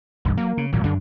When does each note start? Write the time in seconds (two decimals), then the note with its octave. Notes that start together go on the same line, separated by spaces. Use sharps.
0.25 E1 B1 G2
0.37 F#3 A#3
0.57 C#3
0.73 G#1 D2 A#2 F#3
0.84 F#2 D3 D4